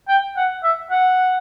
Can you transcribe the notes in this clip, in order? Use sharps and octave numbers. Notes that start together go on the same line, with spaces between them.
G5
F#5
E5
F#5